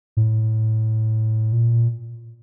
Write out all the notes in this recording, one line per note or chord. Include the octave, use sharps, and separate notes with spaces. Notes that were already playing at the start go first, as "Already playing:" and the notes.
A2
A#2